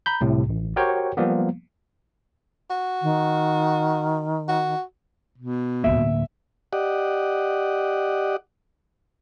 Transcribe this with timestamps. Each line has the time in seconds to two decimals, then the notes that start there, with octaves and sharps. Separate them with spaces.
0.06 A#5 B5 G6
0.21 C2 A2 C3
0.49 A1
0.76 F#4 G4 A#4 C5 C#5 G5
1.17 F3 G3 A#3 B3
2.70 F#4
3.02 D#3
4.48 F#4
5.38 B2
5.84 D1 G#1 A#3 E5
6.73 G4 D5 D#5 F#5